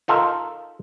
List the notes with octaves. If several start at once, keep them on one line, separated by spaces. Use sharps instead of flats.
D#4 F4 A4 A#4